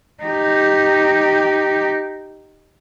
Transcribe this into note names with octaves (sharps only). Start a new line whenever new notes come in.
D#4 G4